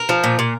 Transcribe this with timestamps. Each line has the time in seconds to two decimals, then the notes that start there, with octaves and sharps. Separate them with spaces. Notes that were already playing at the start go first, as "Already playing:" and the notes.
Already playing: A#4
0.09 F3
0.24 A#2
0.39 A#2